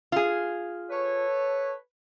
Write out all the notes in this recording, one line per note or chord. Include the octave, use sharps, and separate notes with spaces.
F4 G#4
A4 B4 C#5